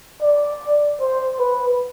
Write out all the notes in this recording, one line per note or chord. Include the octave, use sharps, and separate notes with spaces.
D5
C5
B4